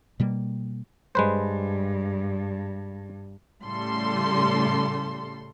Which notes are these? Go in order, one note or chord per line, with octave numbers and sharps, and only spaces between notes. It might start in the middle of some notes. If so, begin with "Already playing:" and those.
B2 G3 A#3
G2 G#3 B4 C5
A2 C#3 G3 A4 C6